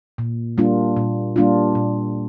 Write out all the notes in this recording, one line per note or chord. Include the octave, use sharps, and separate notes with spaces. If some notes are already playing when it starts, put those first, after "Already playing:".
A#2
G3 A#3 D4 F4
A#2
G3 A#3 D4 F4
A#2